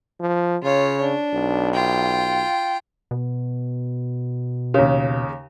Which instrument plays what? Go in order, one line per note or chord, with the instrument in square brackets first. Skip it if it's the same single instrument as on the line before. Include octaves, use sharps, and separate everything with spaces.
[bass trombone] F3
[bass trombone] C#3 [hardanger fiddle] F4 C#5
[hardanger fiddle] D4
[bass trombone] B1
[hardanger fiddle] F4 G5
[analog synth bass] B2
[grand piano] D#2 C#3